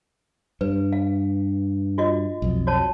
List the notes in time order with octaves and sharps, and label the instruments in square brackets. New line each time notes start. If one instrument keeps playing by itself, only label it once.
[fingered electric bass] G2 [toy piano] B4
[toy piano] F5
F4 F#4 D#5
[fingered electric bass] B1 F2
[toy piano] F#4 C#5 A5